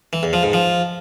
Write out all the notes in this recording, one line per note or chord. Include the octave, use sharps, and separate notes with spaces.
E3
E2
F3
G#2
F3